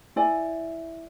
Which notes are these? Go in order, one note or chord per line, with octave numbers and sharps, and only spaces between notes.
E4 D5 G#5